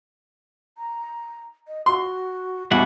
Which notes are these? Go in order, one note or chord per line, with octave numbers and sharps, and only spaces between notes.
A#5
D#5
F#4 C6
E2 B2 G3 E4 F#5 G#5